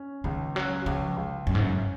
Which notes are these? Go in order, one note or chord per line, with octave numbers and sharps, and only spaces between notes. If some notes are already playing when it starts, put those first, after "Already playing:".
Already playing: C#4
C#2 D#3
F#3 C#4
C#2 F3
C#2
F#2 C#4
G#2
F#2